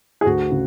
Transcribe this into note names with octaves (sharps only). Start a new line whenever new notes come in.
G#4
D2 F#4
C#3